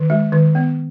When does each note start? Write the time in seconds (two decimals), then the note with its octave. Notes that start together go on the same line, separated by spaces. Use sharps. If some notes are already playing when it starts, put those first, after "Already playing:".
Already playing: D#3
0.10 G#3
0.32 D#3
0.55 B3